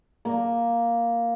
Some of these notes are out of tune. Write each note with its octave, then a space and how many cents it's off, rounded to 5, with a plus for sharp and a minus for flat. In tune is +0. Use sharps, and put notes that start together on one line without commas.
A#3 +0